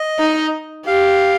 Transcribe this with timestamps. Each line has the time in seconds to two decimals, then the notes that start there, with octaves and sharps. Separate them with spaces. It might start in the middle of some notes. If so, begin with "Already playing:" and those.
Already playing: D#5
0.19 D#4
0.87 G4 F5